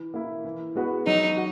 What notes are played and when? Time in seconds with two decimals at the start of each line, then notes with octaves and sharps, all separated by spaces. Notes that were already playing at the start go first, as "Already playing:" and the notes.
Already playing: E3
0.14 A#3 E4
0.45 E3
0.75 G#3 B3 F#4 B4
1.07 F#3 D#4
1.37 F#4